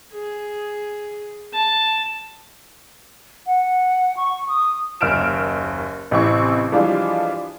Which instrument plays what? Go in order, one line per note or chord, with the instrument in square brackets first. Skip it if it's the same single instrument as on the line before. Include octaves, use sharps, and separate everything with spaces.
[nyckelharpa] G#4
A5
[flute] F#5
C#6
D#6
[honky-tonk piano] F#1 D#2 F6 D7 E7
A1 C3 E3 C4 C#6
E3 F3 G3 G#3 D4 F4